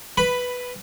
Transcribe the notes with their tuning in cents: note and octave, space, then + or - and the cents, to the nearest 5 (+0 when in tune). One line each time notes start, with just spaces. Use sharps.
B4 +0 B5 +10